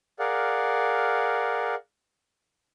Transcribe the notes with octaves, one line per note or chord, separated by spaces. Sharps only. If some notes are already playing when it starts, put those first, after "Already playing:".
G#4 A#4 D5 F5 F#5